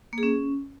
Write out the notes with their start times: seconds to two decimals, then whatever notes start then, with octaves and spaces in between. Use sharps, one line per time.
0.13 A#3
0.18 G#4
0.23 C#4